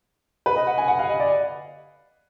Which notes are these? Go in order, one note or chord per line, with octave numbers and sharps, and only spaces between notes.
B4
D#5
F#5
G#5
F#5
F5
D#5
D5